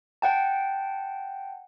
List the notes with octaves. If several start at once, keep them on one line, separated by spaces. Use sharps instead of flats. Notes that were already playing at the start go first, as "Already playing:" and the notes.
F#5 G5 A5